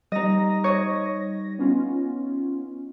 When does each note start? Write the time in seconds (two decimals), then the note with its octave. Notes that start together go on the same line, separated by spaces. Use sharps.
0.12 G3 D#4 D#5 A#6
0.64 C#5 D#5
1.59 B3 C#4 F4